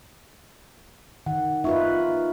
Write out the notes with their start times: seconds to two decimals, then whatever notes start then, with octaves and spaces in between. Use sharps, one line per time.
1.26 D#3 F#5
1.64 D#4 F4 B4 E5 C#6